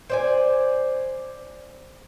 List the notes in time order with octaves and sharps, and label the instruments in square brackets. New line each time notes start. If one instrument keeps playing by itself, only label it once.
[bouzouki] C5 D5 G#5